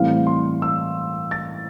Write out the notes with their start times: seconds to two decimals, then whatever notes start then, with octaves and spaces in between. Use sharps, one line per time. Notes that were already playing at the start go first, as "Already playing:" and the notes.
Already playing: A2 E3 G3 C4 F5
0.27 C6
0.62 E6
1.31 A6